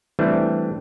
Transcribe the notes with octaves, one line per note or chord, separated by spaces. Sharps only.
E3 G3 A3 C4 D4